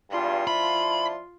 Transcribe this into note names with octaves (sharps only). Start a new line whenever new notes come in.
E2 G2 F4 C6
F3 D4 E4 B5